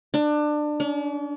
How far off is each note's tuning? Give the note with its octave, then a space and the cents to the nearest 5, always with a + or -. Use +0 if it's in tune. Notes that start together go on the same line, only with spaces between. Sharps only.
D4 +25
D4 -45